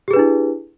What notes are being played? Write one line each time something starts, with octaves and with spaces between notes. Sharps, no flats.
D4 E4 G4 G#4 B4